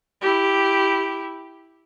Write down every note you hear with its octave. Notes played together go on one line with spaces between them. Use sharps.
E4 G4